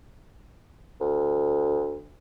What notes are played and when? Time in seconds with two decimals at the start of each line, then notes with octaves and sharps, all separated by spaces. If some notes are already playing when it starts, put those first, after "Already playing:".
1.01 D2